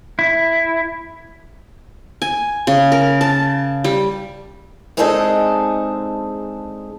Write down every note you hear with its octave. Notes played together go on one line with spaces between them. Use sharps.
E4
G#5
C#3
A#4
A5
G3
G#3 C4 D4 D#4 G#4 A4